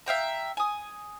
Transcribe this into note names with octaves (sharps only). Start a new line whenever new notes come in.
E5 F5 G5 A#5
G#5 D#6